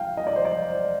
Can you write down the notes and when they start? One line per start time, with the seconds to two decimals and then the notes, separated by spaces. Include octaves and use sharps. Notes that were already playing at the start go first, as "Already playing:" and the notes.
Already playing: F5 G5
0.17 D#5
0.27 D5
0.36 C5
0.45 D5